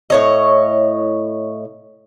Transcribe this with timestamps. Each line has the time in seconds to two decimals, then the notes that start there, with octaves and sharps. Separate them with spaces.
0.10 A2 C#5 D#5